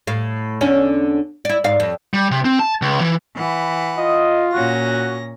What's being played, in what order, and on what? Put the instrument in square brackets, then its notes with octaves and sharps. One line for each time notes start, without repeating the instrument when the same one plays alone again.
[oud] A2 F5
E2 D3 C#4
E4 D5
G#2 D5 F5
F2
[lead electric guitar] G3
C3
C4
A5
C#2
E3
[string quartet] E3 F#5 B5
[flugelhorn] F4 [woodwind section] D#5
[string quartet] A#2 C#4 A#6 [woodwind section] F#4